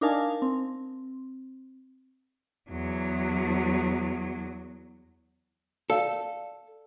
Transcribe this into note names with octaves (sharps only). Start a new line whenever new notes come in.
D4 D#4 A#4 F5 G#5 A5
C4
E2 F#3
A4 D5 F5